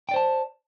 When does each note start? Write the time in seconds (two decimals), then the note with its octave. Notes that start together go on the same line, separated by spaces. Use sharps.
0.09 G5
0.11 D5
0.14 C5
0.16 A5